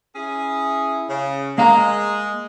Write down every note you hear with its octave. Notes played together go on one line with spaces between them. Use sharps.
C#4 E4 G#4
C#3
G#3 A#3 F5 A#5